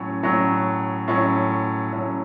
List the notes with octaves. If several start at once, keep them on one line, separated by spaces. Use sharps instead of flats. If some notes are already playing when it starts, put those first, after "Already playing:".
Already playing: A2 F#3 C#4
A2 F#3 C#4
A2 F#3 C#4
A2 F#3 C#4